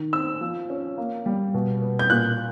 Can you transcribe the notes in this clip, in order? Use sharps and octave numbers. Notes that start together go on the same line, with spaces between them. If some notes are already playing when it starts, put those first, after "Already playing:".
Already playing: D#3
C4 E6
F3
C#4
A#3
G3
B2
B3
G6
A#2 F#6